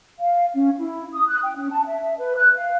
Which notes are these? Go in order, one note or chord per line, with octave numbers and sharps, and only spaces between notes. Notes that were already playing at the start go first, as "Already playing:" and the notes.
F5
C#4
E4
D#6
F#6
G5
C#4
A5
E5
B4
F#6
F5